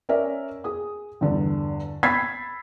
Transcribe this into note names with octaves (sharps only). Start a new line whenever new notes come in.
C#4 A#4 D5 E5
G#4 D#6
E2 G2 D3
B5 E6 G#6 A6 B6 C7